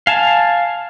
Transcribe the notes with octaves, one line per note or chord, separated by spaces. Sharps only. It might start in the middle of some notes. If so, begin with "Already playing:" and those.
F5 G#5 A5